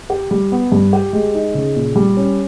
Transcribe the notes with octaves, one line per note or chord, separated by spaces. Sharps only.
G4
G3
B3
G2
G4
G#3
D#4
C#3
A#2
G3
C#4